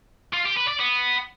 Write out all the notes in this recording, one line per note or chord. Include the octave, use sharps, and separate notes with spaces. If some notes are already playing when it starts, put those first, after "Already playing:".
F4
G4
B4
D5
B3